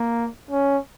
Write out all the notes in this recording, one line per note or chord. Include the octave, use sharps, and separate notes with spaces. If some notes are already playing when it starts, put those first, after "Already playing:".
Already playing: A#3
C#4